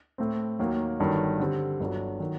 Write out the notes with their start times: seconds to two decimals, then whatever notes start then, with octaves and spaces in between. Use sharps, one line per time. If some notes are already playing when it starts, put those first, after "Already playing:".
0.18 A2 A3 C4
0.59 D#2 D#3 F#3 A#3
0.99 G1 G2 D#3 F#3
1.40 D3 G3 C4
1.80 G1 G2 F#3
2.20 D#3 F#3